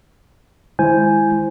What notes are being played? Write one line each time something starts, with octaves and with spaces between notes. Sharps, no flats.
D#3 G#3 E4 C5 G#5 G6